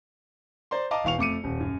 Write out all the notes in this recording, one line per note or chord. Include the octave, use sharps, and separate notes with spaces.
C5 D5 A#5 C6
D#5 F5 A5 A#5 D6
E1 E3 F5 C#6 F7
F2 A3 D6 C#7 D#7
D#1
F#2